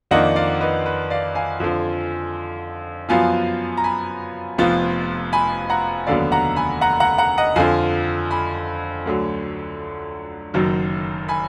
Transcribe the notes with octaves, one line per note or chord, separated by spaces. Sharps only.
F2 D#3 A#3 D4 F4 D#5 F#5
D5 F5
B4 D#5
B4
D5 F5
F5 G#5
F2 D3 F3
F#2 F3 B3 F4 F5 G#5
A#5
G#5 B5
F1 F2 F3 B3 F4
G#5 B5
F#5 A#5
F1 D#2 D3 F#3 B3 D5 F5
F#5 A#5
G#5 B5
F#5 A#5
F#5 A#5
F#5 A#5
D#5 F#5
F2 D3 F3 F5 G#5
G#5 B5
D2 D3 F#3
F#1 F#2 D#3 F#3
G#5 B5